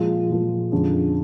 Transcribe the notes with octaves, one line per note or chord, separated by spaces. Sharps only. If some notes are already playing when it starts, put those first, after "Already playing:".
Already playing: A#2 F3 G#3
A#2 F3 G#3
F2 D3 F3 G#3 C#4